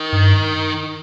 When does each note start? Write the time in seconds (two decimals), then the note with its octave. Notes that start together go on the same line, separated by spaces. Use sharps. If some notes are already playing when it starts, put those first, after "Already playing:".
Already playing: D#3
0.12 G2